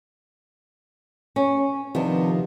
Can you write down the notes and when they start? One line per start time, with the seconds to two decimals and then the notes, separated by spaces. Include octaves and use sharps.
1.36 C#4
1.95 C3 D#3 F3 B3 D4